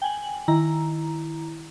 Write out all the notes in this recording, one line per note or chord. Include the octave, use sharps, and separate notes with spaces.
G5 G#5 F#7
D#3 E4 A#5